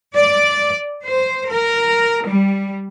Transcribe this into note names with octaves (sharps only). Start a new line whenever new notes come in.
D5
C5
A#4
G3